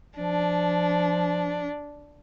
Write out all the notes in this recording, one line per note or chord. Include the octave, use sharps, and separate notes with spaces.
F3 D4